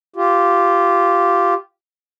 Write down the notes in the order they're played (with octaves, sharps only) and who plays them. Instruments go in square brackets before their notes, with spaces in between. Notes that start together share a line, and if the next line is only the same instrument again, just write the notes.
[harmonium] F4 G4